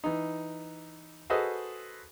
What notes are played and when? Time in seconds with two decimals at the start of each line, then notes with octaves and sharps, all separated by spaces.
0.04 E3 D#4
1.30 F#4 G#4 A4 B4 C5 D#5